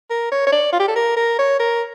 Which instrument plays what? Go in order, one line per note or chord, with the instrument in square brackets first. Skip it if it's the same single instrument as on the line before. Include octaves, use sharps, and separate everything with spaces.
[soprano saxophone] A#4
C#5
C#5
D5
F4
G4
A4
A#4
A#4
C#5
A#4